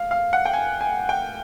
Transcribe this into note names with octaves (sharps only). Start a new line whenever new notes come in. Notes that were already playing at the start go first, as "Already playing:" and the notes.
Already playing: F5
F5
F#5
G5
G#5
G#5
G5